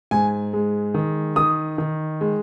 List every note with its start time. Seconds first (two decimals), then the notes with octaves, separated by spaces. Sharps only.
0.11 G#2 G#5
0.53 G#3
0.94 D#3
1.36 D#3 D#6
1.78 D#3
2.21 G#3